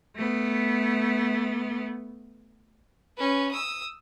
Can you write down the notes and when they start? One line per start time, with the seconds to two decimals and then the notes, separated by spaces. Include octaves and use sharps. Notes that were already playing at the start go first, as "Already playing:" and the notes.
0.16 A3 B3
3.17 C#4 B4
3.51 D#6 E6